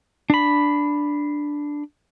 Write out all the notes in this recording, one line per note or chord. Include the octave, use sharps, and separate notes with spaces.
D4 B5